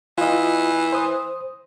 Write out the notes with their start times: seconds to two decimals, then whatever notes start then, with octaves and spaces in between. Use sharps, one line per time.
0.18 E3 F4 D#5
0.93 C5 D#6